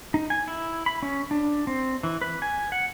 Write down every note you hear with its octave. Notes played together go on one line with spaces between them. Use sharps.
D#4
G#5
E4
B5
C#4
D4
C4
E3
B4
G#5
F#5